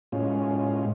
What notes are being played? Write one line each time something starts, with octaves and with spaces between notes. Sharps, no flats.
A2 G#3 C#4 F4